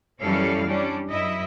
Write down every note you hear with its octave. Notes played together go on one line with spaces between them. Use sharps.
F#2 E3 G3 C#4 A4 F5
G3 C#4 D4
F#2 E4 D#5 E5